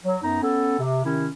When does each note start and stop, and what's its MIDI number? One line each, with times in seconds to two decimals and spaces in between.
0.05 0.18 54
0.23 0.39 42
0.23 0.39 59
0.23 0.39 63
0.23 0.39 82
0.42 0.78 59
0.42 0.78 61
0.42 0.78 69
0.79 1.01 48
1.04 1.28 48
1.04 1.28 51
1.04 1.28 61
1.04 1.28 64